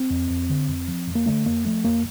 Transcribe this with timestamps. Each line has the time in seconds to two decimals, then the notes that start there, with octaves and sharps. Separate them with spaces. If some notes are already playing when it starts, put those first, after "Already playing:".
Already playing: C4
0.10 F2
0.30 F2
0.50 D3
0.69 F2
0.88 F3
1.08 F2
1.15 A#3
1.26 D3 A3
1.46 F2 A#3
1.65 F3 A3
1.84 F2 A#3